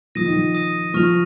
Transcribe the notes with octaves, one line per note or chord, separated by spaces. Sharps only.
F3 D#6 A#6 D#7
D#3
F3
D#6 A#6 D#7
F3 C#6 F6 A#6 F7